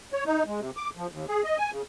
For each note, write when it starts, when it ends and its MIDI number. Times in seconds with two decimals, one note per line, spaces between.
0.13 0.24 73
0.26 0.43 63
0.47 0.60 56
0.60 0.70 48
0.77 0.90 86
0.97 1.07 53
1.11 1.25 39
1.29 1.42 68
1.44 1.58 75
1.58 1.72 80
1.72 1.82 49